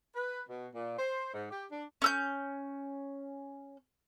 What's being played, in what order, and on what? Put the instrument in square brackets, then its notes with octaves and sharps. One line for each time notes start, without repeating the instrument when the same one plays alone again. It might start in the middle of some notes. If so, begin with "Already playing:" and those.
[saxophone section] B4
B2
A#2
C5
G#2
G4
D4
[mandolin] C#4 E6 G6